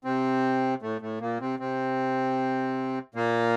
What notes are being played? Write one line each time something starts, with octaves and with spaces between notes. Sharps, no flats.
C3 C4
A2 A3
A2 A3
A#2 A#3
C3 C4
C3 C4
A#2 A#3